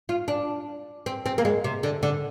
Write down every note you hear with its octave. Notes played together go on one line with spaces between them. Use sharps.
F4
D4
C4
C4
A#3
G#3
C3
D3
D3